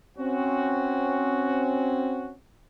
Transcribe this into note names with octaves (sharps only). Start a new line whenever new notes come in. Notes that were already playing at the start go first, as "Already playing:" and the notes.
C4 C#4 F#4